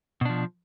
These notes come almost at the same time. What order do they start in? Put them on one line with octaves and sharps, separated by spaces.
B2 D4 F3